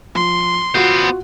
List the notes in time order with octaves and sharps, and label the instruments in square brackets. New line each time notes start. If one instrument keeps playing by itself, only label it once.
[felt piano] F3 [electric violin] C6
[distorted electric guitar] B3 C5 [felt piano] F4 F#4